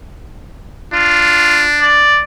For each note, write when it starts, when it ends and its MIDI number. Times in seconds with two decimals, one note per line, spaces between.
0.93 2.06 62
0.93 1.64 65
1.81 2.20 74